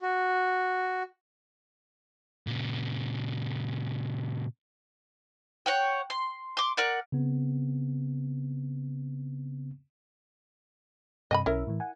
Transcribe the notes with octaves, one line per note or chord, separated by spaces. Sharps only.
F#4
A#2 C#3
C#5 F#5 G5
C6
C6 D6
A#4 D5 F#5
C#3 B3 C4
G2 C3 D#5 G#5 B5
B1 C#4 E4 A#4 E5
A2 E3
F#5 G#5